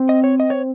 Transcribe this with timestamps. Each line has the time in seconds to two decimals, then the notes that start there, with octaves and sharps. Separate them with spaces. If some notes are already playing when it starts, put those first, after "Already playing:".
Already playing: C4
0.09 D#5
0.24 C#5
0.40 D#5
0.50 C#5